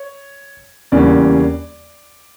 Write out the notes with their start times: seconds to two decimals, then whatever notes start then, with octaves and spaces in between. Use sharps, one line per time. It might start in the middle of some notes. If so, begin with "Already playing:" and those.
Already playing: C#5
0.92 E2 C#3 G3 A#3 C#4 D5